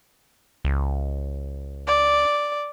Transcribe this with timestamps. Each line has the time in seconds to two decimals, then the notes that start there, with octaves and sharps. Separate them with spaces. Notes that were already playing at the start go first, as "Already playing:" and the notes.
0.65 C#2
1.87 D5